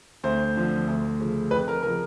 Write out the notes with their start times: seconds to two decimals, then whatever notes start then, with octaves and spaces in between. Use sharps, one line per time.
0.24 D2 C5
0.56 D3 F3
0.88 D2
1.19 C#3 F3
1.51 F2 B4
1.68 A#4
1.83 C#3 F3 A#4